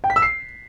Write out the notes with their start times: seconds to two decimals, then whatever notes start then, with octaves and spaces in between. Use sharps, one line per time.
0.04 G5
0.10 B6
0.16 E6
0.22 C7